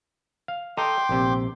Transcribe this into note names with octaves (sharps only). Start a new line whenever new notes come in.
F5
A4 D#5 G5 A#5 C6 D6
A#1 C3